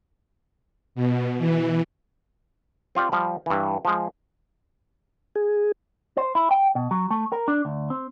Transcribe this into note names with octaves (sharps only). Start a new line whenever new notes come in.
B2
E3
C4 F4 G4 D5
F3 G3
G2 E3
F3 G#3
G#4
C5
E4
G5
B2
F#3
A3
A#4
D4
D2
C4